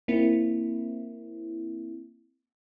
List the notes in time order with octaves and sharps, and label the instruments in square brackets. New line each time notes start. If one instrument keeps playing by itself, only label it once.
[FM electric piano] A#3 C4 E4